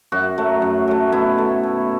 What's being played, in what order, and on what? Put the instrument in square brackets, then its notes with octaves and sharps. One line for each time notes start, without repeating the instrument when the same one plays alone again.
[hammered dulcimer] F#2 F#4
F#3 A3
F#2
F#3 A3
B2 E4
A3
B2